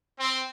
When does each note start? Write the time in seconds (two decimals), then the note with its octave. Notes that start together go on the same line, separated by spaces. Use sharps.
0.19 C4